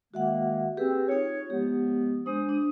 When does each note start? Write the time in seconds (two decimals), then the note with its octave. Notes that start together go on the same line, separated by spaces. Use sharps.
0.14 D#3 G#3 A#3 F#4 E5 F#5
0.77 C4 G4 G#4 B4
1.08 D#4 F4 C#5
1.50 F3 G#3 B3 G4
2.26 G#3 D4 C5 D#6
2.49 D4